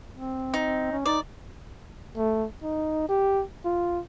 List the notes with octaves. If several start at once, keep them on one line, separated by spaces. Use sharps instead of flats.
C4
D#4
C#4
D#4 D5
A3
D#4
G4
F4